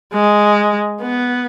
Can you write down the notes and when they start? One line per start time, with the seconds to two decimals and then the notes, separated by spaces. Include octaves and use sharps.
0.13 G#3
1.02 B3